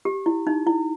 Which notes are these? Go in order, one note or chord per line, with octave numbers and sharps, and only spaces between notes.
G4
E4
D#4
E4